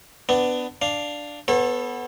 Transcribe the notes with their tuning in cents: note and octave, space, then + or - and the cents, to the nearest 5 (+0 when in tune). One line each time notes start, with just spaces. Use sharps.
B3 +20 D4 +10
D4 +0 F5 +0
B3 +0 A4 +0 C#5 -45